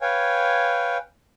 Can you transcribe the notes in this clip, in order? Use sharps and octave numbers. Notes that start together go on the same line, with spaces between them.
B4 C#5 F5 G5 G#5